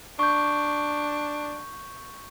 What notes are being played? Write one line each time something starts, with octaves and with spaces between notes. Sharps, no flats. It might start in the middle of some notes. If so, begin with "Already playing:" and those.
D4 C#6 G6